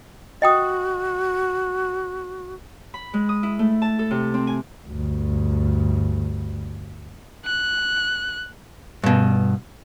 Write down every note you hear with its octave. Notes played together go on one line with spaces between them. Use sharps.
F#4 D#5 G5 D#6
B5
G#3
D#6
E4
A3
A5
A4
C3
C4
G#5
D2 G2
F#6
G2 B2